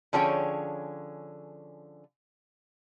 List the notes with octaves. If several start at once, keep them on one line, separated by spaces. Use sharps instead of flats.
D3 F3 C#4 G#4 C#5 G5